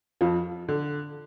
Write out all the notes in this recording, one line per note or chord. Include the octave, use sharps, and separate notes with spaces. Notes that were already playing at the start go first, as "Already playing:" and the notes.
F2 F3
D3